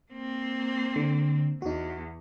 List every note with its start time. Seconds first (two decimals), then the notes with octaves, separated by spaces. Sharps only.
0.12 A#3 C4
0.96 D3
1.62 E2 D#4 F#4